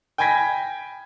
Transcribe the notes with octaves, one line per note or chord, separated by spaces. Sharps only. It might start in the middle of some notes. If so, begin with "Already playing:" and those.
G5 G#5 B5 G#6 A#6 B6